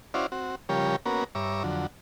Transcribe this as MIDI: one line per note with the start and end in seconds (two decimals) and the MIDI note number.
0.14 0.26 61
0.14 0.26 64
0.14 0.26 66
0.14 0.26 72
0.14 0.26 74
0.14 0.26 77
0.32 0.55 60
0.32 0.55 66
0.69 0.96 49
0.69 0.96 53
0.69 0.96 55
0.69 0.96 67
0.69 0.96 70
0.69 0.96 73
1.06 1.24 58
1.06 1.24 59
1.06 1.24 61
1.06 1.24 66
1.06 1.24 70
1.35 1.63 43
1.35 1.63 73
1.35 1.63 76
1.35 1.63 82
1.35 1.63 86
1.64 1.87 41
1.64 1.87 50
1.64 1.87 54